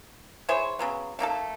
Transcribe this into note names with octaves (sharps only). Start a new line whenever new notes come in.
E4 G#4 C5 C#5
C#3 F#3 B3
A3 A#3 D#4 A4